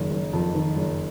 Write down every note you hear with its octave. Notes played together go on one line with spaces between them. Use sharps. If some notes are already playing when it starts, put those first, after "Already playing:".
Already playing: F#1 D#3
F#1
F2
D#3
F#1